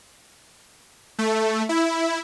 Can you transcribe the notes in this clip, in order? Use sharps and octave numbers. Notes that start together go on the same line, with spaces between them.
A3
E4